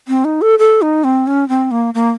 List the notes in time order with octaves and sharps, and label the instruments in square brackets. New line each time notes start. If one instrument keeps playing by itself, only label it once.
[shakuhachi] C4
D#4
A4
A4
D#4
C4
C#4
C4
A#3
A#3